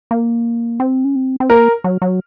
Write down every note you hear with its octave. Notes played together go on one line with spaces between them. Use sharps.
A#3
C4
C#4
C4
C4
A#3 A#4
F#3
F#3